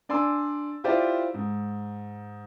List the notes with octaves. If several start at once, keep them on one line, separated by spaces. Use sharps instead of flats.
D4 D5 G#5 C6 E6
E4 F4 G4 C5 D5 E5
G#2